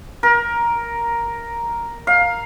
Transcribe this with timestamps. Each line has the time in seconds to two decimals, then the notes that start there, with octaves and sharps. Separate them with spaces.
0.23 A#4
2.07 F5